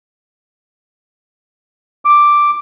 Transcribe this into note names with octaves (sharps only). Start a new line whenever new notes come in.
D6